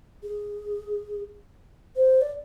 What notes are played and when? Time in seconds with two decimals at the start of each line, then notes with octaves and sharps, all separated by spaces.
0.23 G#4
1.96 C5
2.21 D5